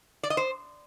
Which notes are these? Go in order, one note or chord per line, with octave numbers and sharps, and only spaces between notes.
D5
D#5
C5